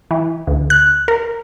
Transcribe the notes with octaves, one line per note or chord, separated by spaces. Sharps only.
E3
D2
F#6
A#4